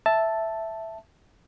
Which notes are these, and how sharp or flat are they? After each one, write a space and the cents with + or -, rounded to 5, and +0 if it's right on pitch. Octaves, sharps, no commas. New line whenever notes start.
E5 +0 A5 +0